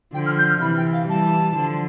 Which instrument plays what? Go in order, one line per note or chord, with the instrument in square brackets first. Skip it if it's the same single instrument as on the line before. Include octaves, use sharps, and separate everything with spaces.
[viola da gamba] D3 F3 [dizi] G5
[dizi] F6
G6
F6
[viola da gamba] C3 E3 [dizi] B5
[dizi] G5
F5
[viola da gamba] E3 G3 [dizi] A5
[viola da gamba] D3 F3